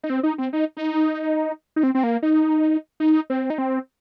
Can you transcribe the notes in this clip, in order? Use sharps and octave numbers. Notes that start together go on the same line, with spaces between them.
D#4
C4
D#4
C4
D#4
D#4
D#4
C4
C4
A#3
D#4
D#4
C4
D#4
C4